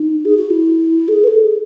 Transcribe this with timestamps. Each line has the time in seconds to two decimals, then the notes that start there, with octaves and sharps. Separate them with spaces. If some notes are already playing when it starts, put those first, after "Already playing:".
Already playing: D#4
0.25 G#4
0.37 F#4
0.50 E4
1.08 A4
1.13 G#4
1.24 B4
1.27 A4
1.44 G#4